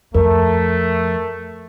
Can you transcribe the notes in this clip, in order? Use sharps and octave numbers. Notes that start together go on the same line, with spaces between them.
F2 A3 A#4